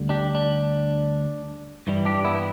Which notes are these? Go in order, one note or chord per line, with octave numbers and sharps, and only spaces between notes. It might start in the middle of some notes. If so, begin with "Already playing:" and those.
Already playing: D2 D3 G3
D4 G4
D4
G2 E3 G3
D4 G4
B3 E4
B3